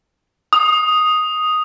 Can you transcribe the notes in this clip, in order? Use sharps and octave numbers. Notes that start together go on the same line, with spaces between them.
D#6